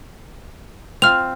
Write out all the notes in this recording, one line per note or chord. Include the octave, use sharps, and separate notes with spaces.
C4 F4 F6 F7